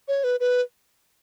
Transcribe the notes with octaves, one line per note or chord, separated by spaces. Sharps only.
C#5
B4
B4